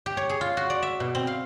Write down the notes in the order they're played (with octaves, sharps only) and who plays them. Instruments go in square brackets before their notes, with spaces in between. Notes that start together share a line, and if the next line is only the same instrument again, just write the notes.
[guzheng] G4
C#5
G#4
F4
F#4
D5
E5
B2
C4
F5